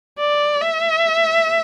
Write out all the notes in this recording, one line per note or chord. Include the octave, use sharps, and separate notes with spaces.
D5
E5